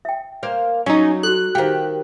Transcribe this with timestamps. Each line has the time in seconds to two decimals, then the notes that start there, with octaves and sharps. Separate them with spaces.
0.05 E5 G5
0.43 A#3 C5 F5
0.86 F#3 C#4 D#4
1.23 F#4 A4 F#6
1.55 D#3 G4 C5 F5 G5